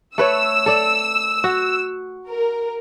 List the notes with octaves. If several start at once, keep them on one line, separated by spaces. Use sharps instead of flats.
A3 B4 C#5 E6
A4 D5
F#4
A#4